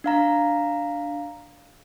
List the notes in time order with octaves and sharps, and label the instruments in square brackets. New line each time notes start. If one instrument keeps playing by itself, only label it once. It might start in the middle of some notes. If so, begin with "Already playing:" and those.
[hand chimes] D4 F5 A#5